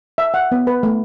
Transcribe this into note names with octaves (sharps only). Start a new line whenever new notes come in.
E5
F#5
B3
B4
A3